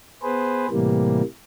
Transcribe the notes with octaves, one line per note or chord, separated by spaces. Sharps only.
B3 G#4 B4 C5
A2 C3 E3 G3 A#3